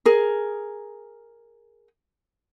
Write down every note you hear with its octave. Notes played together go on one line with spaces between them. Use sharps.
G#4 A#4